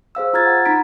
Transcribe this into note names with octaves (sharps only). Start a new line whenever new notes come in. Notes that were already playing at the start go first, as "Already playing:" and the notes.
G#4 C5 F5 E6
F4 A#5 F6 G#6 A6
F#5
D#4 A#5 B5 B6 D7